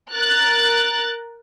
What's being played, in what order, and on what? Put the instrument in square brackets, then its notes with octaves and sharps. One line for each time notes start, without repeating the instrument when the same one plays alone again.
[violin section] A#4 F#6 A6